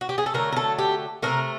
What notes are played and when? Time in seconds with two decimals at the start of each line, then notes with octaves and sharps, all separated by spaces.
0.01 F#4
0.09 G4
0.18 G#4
0.26 A4
0.34 D3 F#3 A3 A#4
0.52 A#4
0.56 A4
0.78 G4
1.22 C3 E3 A3 A#4